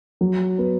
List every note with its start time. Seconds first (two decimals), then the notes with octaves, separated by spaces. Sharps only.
0.21 F#3
0.58 B3